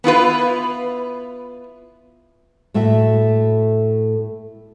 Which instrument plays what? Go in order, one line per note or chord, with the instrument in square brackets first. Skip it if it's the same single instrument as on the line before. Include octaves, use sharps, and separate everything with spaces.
[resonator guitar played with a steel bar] B3 E4 F4 B4
[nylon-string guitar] A2 A3 E4 F#4 E5